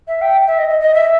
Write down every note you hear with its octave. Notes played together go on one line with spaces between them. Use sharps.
E5
G5
E5
D#5
D#5
D#5
E5